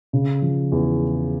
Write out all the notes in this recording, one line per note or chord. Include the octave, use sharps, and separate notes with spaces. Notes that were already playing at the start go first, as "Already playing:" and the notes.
C#3
F3
E2